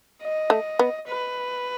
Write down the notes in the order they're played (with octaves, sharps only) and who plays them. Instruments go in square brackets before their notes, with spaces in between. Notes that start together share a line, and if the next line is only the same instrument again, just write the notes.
[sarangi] D#5
[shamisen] A3
B3
[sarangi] B4